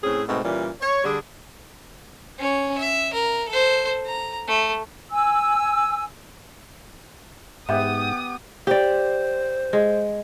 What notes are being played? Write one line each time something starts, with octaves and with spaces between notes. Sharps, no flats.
A2 C4 C#4 G#4
G#2 B2 A3 C4
A#2 E3 G3 C#4
C#5
D3 G3 D4 G#4
C#4 C#5
E5
A#4
A4 C5
A#5
A3
G#5 E6
G#2 B3 G4 E5 F#5 D#6
G4 C5 D5
G#3